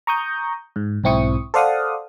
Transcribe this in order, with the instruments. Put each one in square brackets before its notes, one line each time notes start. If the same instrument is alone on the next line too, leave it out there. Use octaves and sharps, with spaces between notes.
[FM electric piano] A#5 C#6 D#6 G6
G#2
B1 G#2 C4 E4 C#6 D#6
A4 C5 D5 F5 F#5 D#6